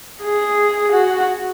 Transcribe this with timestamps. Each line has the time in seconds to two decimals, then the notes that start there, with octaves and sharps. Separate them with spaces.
0.23 G#4
0.92 F#4